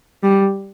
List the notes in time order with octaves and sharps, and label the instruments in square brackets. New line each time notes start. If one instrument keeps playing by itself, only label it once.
[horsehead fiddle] G3